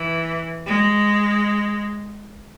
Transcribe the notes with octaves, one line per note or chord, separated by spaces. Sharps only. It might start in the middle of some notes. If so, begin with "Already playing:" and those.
Already playing: E3
G#3